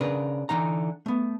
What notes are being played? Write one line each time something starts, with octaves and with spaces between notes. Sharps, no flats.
C#3 D4 A#4 B4
D3 E3 D#4 A#5
A3 B3